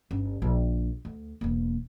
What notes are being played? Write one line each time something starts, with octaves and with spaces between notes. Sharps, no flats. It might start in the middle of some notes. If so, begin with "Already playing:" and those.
G1 C#4
A#1
D2
E1 A#3